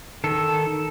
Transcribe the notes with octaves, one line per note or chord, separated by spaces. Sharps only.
D#3 A4